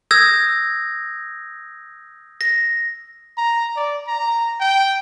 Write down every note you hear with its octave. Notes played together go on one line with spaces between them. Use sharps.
D#6 E6 G6 G#6 A#6
A#6
A#5
D5
A#5
G5